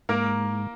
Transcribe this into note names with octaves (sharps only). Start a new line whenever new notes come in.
G#2 A#3 A#4